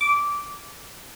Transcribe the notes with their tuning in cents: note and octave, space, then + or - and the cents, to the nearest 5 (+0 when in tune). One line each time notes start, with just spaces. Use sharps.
D6 -10